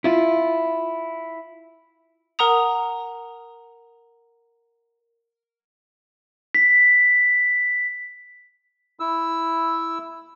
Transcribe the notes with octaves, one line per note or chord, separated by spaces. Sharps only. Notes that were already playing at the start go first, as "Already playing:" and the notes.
E4 F4
A#4 F#5 A#5 D#6 F7
B6
E4 E6